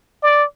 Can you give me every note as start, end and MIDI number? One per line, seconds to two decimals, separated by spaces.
0.23 0.44 74